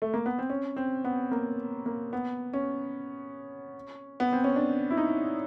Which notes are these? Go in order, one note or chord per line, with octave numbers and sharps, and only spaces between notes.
A3
A#3
B3
C4
C#4
C4
B3
A#3
A#3
B3
C#4
B3
C4
C#4
D4
E4
D#4